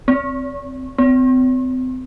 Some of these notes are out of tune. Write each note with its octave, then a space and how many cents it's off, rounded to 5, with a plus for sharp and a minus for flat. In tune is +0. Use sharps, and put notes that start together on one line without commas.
C4 -10
C4 -35